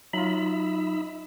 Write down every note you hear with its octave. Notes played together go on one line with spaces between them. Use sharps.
F#3 D#4 F4 E5 B5